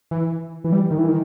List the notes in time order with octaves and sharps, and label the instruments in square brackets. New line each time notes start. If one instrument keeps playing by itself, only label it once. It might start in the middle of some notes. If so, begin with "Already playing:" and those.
[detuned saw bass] E3
E3
G3
D#3
E3
D#3